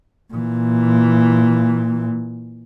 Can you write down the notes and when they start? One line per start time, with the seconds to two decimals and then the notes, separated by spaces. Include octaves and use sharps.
0.34 A#2 E3